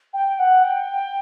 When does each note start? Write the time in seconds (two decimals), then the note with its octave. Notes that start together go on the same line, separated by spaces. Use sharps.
0.13 G5
0.38 F#5
0.63 G5